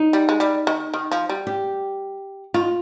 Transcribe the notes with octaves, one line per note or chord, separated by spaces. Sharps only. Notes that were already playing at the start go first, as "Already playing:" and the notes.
Already playing: D#4
G3
G#3
G3
D#3
D#3
F3
G3
G4
D#3 F4